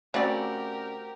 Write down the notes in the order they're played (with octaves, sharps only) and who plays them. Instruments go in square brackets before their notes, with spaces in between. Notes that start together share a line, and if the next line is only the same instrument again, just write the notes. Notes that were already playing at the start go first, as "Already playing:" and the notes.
[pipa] C#3 D5 [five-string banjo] A3 C4 F#4 [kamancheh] G4 A#4